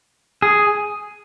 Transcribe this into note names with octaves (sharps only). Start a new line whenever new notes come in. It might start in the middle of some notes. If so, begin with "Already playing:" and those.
G#4